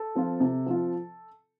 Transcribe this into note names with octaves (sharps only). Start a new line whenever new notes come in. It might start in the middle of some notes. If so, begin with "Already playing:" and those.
Already playing: A4
F3 C4 F4
C3
F3 C4 F4